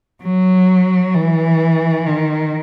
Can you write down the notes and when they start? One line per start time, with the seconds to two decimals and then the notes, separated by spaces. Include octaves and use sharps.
0.23 F#3
1.15 E3
2.07 D#3